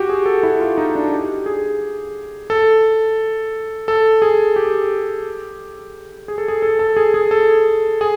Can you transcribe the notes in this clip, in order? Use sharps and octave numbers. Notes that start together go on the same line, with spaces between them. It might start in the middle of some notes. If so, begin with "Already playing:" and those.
Already playing: F#4 G4
G#4
A4
E4
F4
D#4
D4
G4
G#4
A4
A4
G#4
G4
G#4
A4
G#4
A4
A4
G#4
G#4
A4
G#4